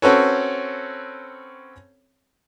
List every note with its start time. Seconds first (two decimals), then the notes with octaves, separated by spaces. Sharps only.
0.02 C4 C#4 F#4 A4 B4 C#5